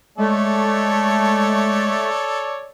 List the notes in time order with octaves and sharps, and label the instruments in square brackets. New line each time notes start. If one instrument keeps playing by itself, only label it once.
[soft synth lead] G#3 [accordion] A3 [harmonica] A4 C#5 D5